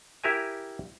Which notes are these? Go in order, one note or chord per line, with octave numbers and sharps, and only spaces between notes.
E4 G4 A#4 E5 G#5